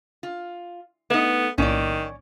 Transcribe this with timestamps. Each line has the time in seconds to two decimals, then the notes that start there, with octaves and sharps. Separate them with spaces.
0.23 F4
1.10 A3 B3 D#4 B4
1.58 B1 A2 D#3 A#3 C#4 D5